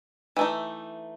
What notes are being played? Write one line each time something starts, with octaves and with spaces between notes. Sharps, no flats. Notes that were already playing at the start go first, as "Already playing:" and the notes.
E3 A3 D#4